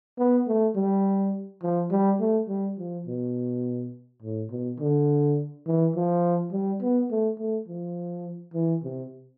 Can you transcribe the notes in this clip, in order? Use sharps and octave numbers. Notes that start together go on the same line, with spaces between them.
B3
A3
G3
F3
G3
A3
G3
F3
B2
A2
B2
D3
E3
F3
G3
B3
A3
A3
F3
E3
C3